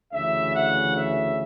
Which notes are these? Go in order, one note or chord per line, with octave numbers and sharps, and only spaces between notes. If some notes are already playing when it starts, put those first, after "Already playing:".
D2 C#3 E3 E5
F#5
E5